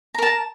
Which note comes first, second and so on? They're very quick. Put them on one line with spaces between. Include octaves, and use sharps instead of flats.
A#5 A#4 A5